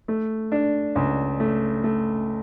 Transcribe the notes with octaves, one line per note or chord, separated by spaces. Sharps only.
A3
D4
C#2
A3
A3